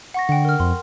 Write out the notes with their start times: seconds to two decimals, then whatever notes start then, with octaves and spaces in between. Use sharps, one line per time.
0.14 F#5 C#6 A#6
0.29 D3 F#5 G5
0.45 A#4 F6
0.60 F2 C6